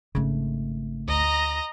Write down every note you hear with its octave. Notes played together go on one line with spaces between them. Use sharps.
G#1 C#3 A3
D2 D#5 A#5